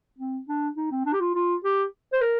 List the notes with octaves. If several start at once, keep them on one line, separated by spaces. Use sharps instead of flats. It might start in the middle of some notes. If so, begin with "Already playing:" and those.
C4
D4
D#4
C4
D4
G4
F4
F4
G4
C5
A#4